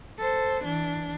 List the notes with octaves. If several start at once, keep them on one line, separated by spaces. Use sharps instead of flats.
A4 C5
E3 D4